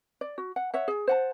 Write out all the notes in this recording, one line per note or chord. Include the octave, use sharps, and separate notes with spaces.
D5
F#4
F#5
C#5 E5 F#5
G#4
C5 F#5 A5